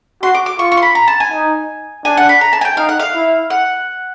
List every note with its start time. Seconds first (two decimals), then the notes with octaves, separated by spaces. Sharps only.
0.22 F#4 C6
0.34 D6
0.46 D6
0.59 F4 C#6
0.72 C#6
0.77 C6
0.83 B5
0.95 A#5
1.08 A5
1.20 G#5
1.32 D#4
2.04 D4 G#5
2.17 F#5
2.29 B5
2.41 A#5
2.53 A5
2.61 G#5
2.65 G5
2.77 D#4 F5
2.89 F#5
3.00 F5
3.14 E4
3.50 F#5